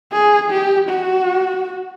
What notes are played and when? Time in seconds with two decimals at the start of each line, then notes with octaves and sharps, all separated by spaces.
0.13 G#4
0.51 G4
0.89 F#4